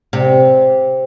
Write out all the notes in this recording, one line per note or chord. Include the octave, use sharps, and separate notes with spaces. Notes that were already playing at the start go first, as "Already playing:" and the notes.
C3